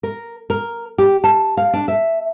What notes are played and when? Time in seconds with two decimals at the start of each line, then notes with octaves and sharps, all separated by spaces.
0.03 A#4
0.50 A#4
0.98 G4
1.24 A5
1.57 F5
1.73 D4
1.88 E5